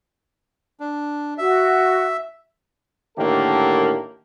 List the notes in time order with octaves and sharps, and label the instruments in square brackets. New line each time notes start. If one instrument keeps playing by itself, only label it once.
[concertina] D4
[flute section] F#4 [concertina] E5
[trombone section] A2 D3 D#3 A#3 G4 A4